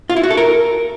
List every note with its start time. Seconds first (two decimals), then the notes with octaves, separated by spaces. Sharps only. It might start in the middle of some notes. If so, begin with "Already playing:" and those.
0.10 F4
0.17 E4
0.23 F#4
0.30 A4
0.37 A#4